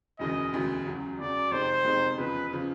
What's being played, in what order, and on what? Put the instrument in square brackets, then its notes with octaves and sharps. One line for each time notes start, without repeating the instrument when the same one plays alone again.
[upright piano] E1 D2 C#3 E3 [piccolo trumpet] D#5
[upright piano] E1 D2 C#3 E3
E2 C#3 F#3
[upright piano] E2 C#3 F#3 [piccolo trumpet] D5
[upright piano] F2 C3 D#3 G#3 [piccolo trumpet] C5
[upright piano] F2 C3 D#3 G#3
[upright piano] E2 C#3 F3 [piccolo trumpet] B4
[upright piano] C#3 F3